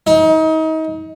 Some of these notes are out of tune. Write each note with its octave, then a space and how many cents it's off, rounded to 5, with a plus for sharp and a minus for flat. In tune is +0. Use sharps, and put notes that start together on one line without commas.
D#4 +35